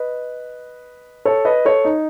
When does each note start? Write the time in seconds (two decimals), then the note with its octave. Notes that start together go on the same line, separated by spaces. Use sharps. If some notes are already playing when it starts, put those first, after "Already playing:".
Already playing: B4 D#5
1.25 A4 C#5
1.45 B4 D#5
1.65 A4 C#5
1.85 D#4